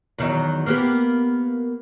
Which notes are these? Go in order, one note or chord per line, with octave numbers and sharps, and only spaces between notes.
E2 D#3 F#3
A#3 B3 G4